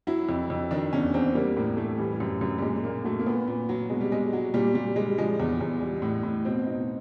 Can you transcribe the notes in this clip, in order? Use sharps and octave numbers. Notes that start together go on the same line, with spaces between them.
F#3 E4
F2
F2
D#3 D4
E2 C#4
E2 C4
G3 A#3
A2 A#3
A2 A3
E3 G3
G3
F#2
F#2
G3
A#2 G#3
A#2 A#3
F#3 A3
A#3
A#2 B3
A#2
F#3
B2 G#3
G3
B2 G#3
F#3
A#2 G3
A#2 G3
G3 G#3
F3 G#3
E2
E2
G3
A2
A2
B2 C4
B2 D#4